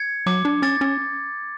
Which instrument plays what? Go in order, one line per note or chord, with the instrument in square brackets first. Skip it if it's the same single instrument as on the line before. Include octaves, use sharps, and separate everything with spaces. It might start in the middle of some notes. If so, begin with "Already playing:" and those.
Already playing: [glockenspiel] G#6 C#7
[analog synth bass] F#3 [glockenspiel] D6
[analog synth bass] D4
[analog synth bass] C#4 [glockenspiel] A6
[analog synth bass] C#4